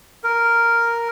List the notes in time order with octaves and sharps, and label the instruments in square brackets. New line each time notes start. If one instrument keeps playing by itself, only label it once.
[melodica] A#4